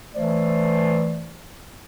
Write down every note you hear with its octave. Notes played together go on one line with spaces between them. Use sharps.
E3 A3 C5 D5